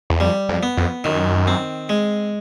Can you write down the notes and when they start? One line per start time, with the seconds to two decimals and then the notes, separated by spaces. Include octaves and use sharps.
0.10 E2
0.20 F2 G3
0.49 F2
0.63 B3
0.77 F2
1.04 F#2 D#3
1.47 C4
1.89 G#3